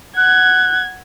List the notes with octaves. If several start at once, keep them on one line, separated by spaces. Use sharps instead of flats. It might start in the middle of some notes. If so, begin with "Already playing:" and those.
F#5 F#6 G#6